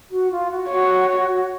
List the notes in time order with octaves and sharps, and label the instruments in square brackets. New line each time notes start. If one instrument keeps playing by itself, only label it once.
[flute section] F#4
F4
F#4
[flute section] F#4 [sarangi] C#5